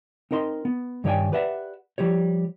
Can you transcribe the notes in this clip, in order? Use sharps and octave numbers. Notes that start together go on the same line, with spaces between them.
C4 D#4 A#4 D#5 C6
B3
G2 D#3 C#5 D5 G5 G#5
G4 B4 D5 E5 F#5
F3 G3 G4 C#5